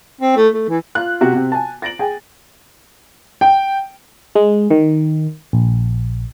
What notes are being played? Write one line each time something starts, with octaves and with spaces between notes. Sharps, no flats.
C4
A3
A3
E3
F4 F#6
C3 F#4
C3 C4
G#5 A5
A6 A#6 D7 F#7
G#4 G5 G#5
G5
G#3
D#3
A#1